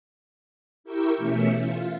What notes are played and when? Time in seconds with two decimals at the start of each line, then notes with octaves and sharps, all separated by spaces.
0.84 E4 G4 A#4 G5 C#6 E6
1.17 B2 E3 A3 C#4 E5 C#7
1.62 F4